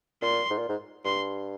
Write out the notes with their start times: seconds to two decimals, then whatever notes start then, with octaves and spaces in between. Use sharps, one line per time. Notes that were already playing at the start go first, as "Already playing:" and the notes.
0.22 A#2 C6
0.50 G#2
0.59 A#2
0.69 G#2
1.05 G2 C6